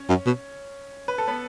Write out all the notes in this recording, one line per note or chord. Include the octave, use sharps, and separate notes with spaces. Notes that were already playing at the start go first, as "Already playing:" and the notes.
Already playing: C#4 C#5
F#2
B2
B4
A4
B3 B4